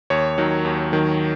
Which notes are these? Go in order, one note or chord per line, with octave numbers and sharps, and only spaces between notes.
D#2 C#5
D#3 F#3
D#2
D#3 F#3